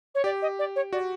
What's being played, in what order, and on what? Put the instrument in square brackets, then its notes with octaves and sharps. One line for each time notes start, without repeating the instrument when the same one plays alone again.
[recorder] C#5
[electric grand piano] G4 [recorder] D5
[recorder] D#5
D5
C#5
[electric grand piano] F#4 [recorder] D5